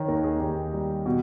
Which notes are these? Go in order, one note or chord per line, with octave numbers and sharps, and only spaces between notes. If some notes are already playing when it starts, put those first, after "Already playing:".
Already playing: D#3 C#5 D#5
D#2 A#4
G#4
D#2 G4
G3
B2